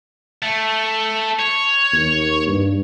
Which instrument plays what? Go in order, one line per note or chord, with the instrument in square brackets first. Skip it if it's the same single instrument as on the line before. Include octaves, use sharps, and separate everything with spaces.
[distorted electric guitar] A3
C#5
[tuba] D#2
G2